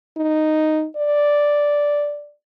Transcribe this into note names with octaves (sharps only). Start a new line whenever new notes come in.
D#4
D5